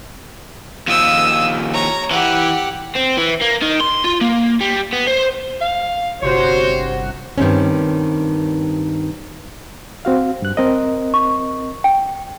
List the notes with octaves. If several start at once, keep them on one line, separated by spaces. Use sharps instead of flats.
D#2 F3 D#6 E6
C#5 A#5
E3 G4 F#5
C4
E3
A#3
D#3
C6
F4
A#3
G3
B3
C5
F5
G1 C3 F#4 C5 C#5
G2 D#3 C4 C#4
C4 F#4 F5
G2 F#6
C4 A#4 D#5
C#6
G5